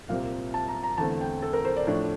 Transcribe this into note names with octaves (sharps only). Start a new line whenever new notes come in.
C2 A#2 G3 C4 F5
A5
A#5
A#5
E2 D3 A3 C4 A5
G5
A4
A#4
C5
D5
A2 F3 A3 D4